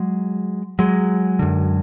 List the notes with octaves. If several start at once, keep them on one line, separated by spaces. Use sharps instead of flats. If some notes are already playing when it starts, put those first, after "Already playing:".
Already playing: F#3 G#3
F#3 G#3
F#2 D3